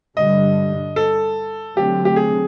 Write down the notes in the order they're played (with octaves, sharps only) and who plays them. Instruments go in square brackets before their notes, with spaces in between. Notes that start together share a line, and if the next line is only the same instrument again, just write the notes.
[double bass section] G2 D3 G3 [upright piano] D#5
[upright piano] A4
[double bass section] D3 F#3 A3 C4 [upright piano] G4
[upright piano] G4
G#4